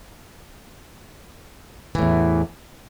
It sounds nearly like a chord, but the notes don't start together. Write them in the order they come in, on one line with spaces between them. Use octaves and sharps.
E3 A2 E2